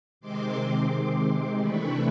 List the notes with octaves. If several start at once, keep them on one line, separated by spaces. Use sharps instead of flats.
C3 D#3 G#3 C4 C6 D6
C3 E3 A3 D4 B5 C#6